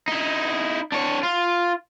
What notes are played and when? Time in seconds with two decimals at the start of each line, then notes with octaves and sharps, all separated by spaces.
0.08 D#4 E4
0.92 D4 C#5
1.23 F4